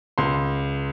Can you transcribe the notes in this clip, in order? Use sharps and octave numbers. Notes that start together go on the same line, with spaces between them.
C#2 C6